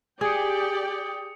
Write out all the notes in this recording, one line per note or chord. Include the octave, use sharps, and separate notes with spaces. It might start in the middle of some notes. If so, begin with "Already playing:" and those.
G4 G#4 D5 G5 D#6 C#7